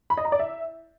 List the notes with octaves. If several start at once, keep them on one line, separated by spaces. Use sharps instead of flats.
B5
D#5
A#5
D5
E5